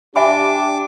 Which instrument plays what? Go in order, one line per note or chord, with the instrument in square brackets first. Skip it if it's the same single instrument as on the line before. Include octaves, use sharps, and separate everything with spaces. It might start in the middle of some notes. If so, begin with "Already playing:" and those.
[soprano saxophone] D4 [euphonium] G4 [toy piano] E5 G#5 B5 [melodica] D6